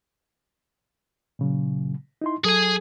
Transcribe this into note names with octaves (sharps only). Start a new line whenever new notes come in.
A#2 C#3 F#3
D#4 E4 C6
F#3 G#4 A4 G#5